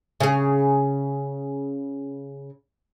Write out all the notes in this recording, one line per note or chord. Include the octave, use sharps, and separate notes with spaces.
C#3 G#4